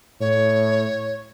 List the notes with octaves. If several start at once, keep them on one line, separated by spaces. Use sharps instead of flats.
A2 C#5